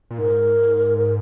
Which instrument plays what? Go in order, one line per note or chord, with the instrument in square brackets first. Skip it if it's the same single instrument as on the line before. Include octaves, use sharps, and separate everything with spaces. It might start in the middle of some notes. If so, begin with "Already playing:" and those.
[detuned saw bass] A#2
[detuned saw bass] G#2 [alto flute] A#4